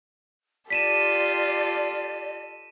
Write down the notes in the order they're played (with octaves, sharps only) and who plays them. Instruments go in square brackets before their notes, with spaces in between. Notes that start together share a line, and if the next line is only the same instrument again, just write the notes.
[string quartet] F4 G4 A4 [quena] D5 [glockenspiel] B6 D#7 E7